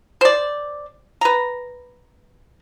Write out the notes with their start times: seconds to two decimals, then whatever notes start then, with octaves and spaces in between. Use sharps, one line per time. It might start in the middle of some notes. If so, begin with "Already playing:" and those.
0.21 C5 D5
1.21 B4 A#5